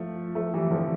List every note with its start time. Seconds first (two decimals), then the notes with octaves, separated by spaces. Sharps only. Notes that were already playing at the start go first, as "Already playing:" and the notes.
Already playing: F3 A3
0.35 F3 A3
0.54 E3 G3
0.71 D3 F3